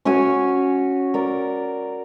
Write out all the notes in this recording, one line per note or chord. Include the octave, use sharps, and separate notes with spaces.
C#4 F#4 C#5 G#5
A#4 D5